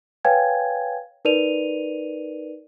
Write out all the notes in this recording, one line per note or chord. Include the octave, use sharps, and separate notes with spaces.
B4 C#5 F5 G5 G#5 G#6
D#4 A#4 B4 D5 D#7 F7